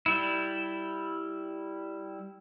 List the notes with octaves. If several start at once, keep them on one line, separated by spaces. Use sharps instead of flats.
G3 E4